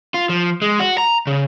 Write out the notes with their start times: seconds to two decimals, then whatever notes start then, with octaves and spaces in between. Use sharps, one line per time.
0.14 F4
0.29 F3
0.62 G#3
0.79 F#4
0.98 A#5
1.27 C#3